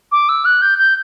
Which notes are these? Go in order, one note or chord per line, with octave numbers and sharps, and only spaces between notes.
D6
E6
F#6
G6
G6